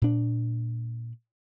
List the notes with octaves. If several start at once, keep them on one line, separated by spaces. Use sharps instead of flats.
A#2 D4